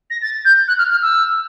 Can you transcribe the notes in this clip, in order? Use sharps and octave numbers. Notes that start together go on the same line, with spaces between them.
A#6
A6
G6
F#6
F6
F6
E6